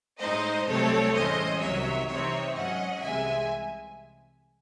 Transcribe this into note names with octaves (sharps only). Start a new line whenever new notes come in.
A2 G#3 D#4 C5 D#5
C2 C3 F#3 A3 C4 A4 C#5
A2 E3 G#3 C#4 C5 D#5
C2 C3 D#3 F#3 C#5 E5
C3 E3 C4 D#4 C#5 E5
G#2 F#3 C#4 D#5 F#5
C2 C3 E3 G#3 E5 G#5